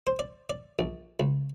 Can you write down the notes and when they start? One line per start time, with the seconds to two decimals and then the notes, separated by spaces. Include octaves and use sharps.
0.07 C5
0.19 D5
0.50 D5
0.79 A#1
1.20 C#2